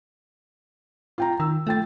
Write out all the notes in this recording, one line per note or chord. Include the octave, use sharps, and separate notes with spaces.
F4 G5 A#5
D#3 E6
F3 A3 G5 A6